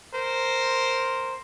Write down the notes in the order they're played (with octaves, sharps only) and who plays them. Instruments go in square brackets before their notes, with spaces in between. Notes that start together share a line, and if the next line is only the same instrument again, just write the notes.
[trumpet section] A#4 C5